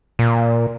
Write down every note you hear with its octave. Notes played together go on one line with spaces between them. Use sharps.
A#2